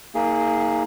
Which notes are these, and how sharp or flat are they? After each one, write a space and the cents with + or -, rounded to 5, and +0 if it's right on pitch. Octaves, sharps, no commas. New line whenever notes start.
A#3 -10 D#4 +40 G#4 +0